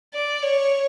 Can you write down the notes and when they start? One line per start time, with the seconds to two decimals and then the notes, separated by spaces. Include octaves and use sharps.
0.14 D5
0.43 C#5